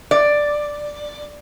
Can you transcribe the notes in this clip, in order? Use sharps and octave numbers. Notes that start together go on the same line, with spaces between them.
D5